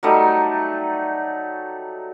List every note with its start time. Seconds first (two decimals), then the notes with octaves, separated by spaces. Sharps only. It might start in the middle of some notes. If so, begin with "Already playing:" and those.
0.03 F#3 G3 A3 D#4